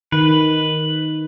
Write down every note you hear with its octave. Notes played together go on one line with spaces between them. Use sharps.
D#3 B4